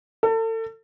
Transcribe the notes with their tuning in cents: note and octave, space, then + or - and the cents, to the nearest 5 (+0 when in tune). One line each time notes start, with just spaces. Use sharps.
A4 +35